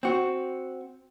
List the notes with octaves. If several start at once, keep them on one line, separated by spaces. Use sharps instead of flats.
C4 F#4